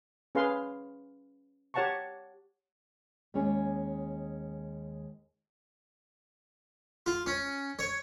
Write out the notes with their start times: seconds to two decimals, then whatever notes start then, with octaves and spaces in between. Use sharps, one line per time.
0.35 C#4 G#4 B4 F5 C6
1.74 G4 C#5 F#5 A5 A#5 C#6
3.34 D#2 G#3 C#4 C#5 D5
7.06 F4
7.26 C#4
7.79 C#5